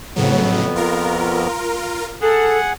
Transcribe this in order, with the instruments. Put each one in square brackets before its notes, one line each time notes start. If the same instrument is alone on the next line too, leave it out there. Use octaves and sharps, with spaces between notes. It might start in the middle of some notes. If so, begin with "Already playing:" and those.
[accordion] F2 B3 [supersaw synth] A2 C#3 F#3
[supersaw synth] F4 A#4
[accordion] G#4 F#5 [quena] A4